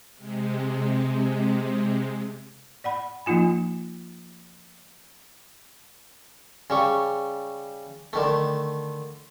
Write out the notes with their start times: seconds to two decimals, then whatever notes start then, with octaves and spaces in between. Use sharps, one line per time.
0.16 C3 G#3
2.84 D5 F#5 B5
3.26 F3 A#3 D#4 F4 G#5
6.70 C#3 G3 C#6
8.13 D3 D#3 A3